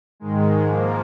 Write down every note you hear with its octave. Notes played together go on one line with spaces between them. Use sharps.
G#2 D#3 G#3
G#2 F3 A#3